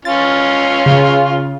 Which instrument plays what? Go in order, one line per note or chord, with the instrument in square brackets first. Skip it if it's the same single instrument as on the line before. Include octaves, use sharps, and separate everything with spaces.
[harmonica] C#4 F4 [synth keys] A6
[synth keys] C#3